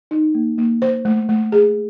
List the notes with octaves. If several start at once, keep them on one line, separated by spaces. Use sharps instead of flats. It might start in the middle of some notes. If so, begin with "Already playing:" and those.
D#4
A#3
A#3
C5
A3
A3
G#4